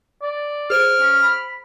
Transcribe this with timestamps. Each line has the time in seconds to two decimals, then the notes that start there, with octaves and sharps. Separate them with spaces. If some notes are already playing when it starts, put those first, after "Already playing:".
0.22 D5
0.70 G#4 C5 F6 D7
1.00 C#4
1.22 B5